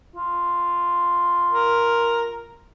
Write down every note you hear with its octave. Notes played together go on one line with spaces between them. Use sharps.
F4
A#4